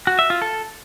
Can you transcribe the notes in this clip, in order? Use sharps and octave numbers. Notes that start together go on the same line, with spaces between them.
F#4
E5
F4
A4